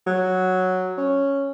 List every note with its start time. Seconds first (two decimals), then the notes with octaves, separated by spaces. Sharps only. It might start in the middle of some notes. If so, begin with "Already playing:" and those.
0.07 F#3
0.98 C#4